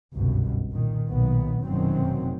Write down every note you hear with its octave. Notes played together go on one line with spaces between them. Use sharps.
G1 C2 F#2 B2
A#2 D#3
B1 A#2 D#3 B3
F1 F#2 B2 D#3 F#3 C4